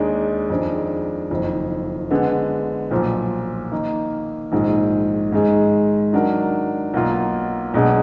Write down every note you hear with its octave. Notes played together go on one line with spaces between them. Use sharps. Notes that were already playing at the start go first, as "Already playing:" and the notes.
Already playing: D#2 D#3 G#3 D4
F2 D#3 G#3 D4
F#1 F2 D#3
D3 G#3 B3
B1 A#2 F3
D#3 A#3 D#4
A#1 G#2 D#3
G#2 D#3 G#3
D#3 F#3 D4 F#4 A#4
B1 B2 A#3 F4
B1 B2 G#3 D4